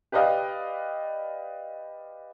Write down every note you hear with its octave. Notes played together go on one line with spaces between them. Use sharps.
G4 B4 D5 D#5 F5 G5